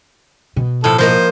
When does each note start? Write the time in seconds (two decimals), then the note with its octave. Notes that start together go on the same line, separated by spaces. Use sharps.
0.56 B2
0.84 A2 F3 A4
0.98 F3 A#3 C5 D#5